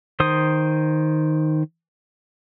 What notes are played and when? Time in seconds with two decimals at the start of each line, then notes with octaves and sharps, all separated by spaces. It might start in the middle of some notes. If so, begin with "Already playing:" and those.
0.20 D#3 C5 D#6